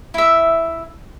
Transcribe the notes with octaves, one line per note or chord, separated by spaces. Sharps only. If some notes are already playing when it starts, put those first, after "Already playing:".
E4 E5